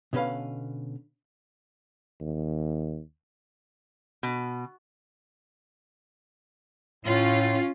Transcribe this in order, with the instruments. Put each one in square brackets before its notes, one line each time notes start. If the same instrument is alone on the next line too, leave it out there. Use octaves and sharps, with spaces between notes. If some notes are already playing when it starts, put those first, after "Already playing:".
[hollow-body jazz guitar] B2 D3 C#4 B4 F5
[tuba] D#2
[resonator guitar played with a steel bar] B2
[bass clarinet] A2 [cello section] C#4 F4